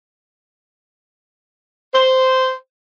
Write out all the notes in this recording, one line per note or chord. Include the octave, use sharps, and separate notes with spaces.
C5